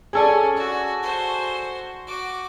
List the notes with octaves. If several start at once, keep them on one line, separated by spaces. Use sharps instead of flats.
C#4 G#4 A4 D5
F#4
F#4 C5
F#4 D6